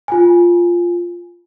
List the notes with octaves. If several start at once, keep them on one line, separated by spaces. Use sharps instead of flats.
F4 G#5